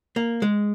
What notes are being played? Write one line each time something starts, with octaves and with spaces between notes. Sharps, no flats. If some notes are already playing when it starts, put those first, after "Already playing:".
A#3
G#3